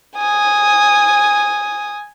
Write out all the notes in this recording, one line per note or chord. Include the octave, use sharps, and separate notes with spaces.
G#5 D#6